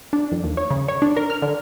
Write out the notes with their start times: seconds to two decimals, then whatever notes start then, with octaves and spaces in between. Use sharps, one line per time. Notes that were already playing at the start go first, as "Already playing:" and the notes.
0.13 D4
0.32 F2
0.44 D#2
0.57 C#5
0.70 C#3
0.88 C#5
1.02 D4
1.17 A#4
1.30 F6
1.42 D3